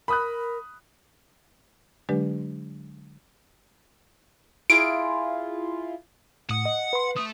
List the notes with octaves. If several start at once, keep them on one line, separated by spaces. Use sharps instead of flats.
A#4 B5 D#6 F#6
D3 F#3 G#3 D4 G4 B4
E4 F4 G#4 D7
A2 F#5 D#6
D#5
B4 C6
A3 D#6